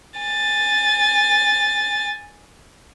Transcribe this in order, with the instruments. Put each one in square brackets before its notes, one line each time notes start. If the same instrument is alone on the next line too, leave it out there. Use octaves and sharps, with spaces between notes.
[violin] G#5 A6